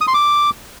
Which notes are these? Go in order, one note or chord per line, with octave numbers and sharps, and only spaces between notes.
D#6
C6
D6